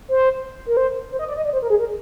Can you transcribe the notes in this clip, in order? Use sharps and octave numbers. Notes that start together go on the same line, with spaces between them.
C5
A#4
C5
C5
D#5
D5
D#5
D5
C5
A#4
G#4
A#4